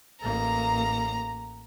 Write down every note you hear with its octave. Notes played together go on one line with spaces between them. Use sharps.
A1 A#3 A#5